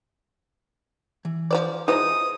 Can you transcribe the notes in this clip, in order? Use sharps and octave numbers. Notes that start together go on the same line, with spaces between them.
E3
F3 C5 D5
E3 F3 G#3 D#4 C5 A#5 D#6